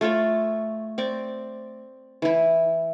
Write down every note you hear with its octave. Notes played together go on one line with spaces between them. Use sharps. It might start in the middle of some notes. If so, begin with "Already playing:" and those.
A3 F4 A4 C#5
C4 D5 C#6
E3 E4